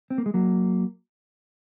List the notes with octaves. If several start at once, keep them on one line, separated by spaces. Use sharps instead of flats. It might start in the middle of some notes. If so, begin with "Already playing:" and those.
C4
A#3
G#3
F#3 A#3